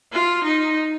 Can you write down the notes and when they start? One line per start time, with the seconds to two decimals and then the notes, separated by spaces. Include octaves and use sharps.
0.13 F4
0.44 D#4